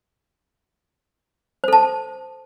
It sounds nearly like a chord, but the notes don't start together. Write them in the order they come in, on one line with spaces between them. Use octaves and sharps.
C5 A4 A5